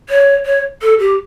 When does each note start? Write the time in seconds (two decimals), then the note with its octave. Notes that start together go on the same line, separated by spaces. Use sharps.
0.09 C#5
0.46 C#5
0.82 A4
0.99 G4